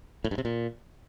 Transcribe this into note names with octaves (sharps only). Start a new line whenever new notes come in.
A2
G2
C3
A#2